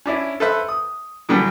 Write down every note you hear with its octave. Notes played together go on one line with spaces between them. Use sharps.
C#4 D4 E4
A4 B4 C5 E5
D#6
A2 D3 E3 F#3 G3 B3